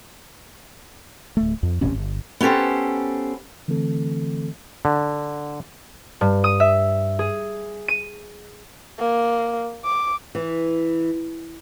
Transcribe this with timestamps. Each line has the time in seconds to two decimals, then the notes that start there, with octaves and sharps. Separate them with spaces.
1.37 D1 A3
1.63 F2
1.81 E1 A1 C3 C#4
1.95 G1
2.41 B3 C#4 G4 A4 C5
3.68 D3 E3 A3 C4 A4
4.85 D3
6.21 G2
6.44 D#6
6.60 E5
7.19 G#4
7.88 D#7
8.99 A#3
9.84 D6
10.35 E3